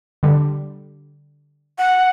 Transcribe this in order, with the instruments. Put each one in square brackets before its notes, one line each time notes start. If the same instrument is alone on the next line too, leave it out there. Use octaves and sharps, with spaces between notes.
[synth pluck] D3 G3
[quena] F#5